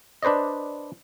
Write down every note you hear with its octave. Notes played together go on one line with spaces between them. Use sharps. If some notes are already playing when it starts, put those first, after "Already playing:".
D4 B4 C5 D5 D#5